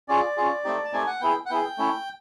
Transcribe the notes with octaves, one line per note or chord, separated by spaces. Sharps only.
C#4 F4 G#4 D5
C#4 F4 G#4
A3 C4 D#4 G4
A5
A3 C4 D#4 G4 G#5
F#5
B3 E4 G#4 G5
F#5
B3 E4 G#4 G5
A3 C#4 E4